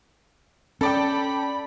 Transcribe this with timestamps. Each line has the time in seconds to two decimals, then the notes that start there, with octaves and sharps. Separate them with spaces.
0.81 C#4 A4 D5 G5 B5